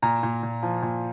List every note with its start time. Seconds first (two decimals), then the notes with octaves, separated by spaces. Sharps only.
0.02 A#2 A#5
0.23 A#2
0.43 A#2
0.63 F3
0.82 A#2